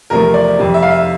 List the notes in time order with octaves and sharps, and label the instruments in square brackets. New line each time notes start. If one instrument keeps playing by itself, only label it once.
[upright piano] E2 C3 F3 A3 A#4
D5
F2 C3 G3
E5
F5
E5